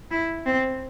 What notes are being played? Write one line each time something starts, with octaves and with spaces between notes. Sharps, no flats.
E4
C4